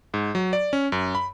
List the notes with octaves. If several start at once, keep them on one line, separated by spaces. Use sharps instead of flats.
G#2
F#3
D5
C#4
F#2
B5